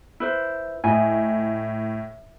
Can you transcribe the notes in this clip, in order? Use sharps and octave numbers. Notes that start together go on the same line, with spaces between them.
E4 B4 C5
A2 D#5 G#5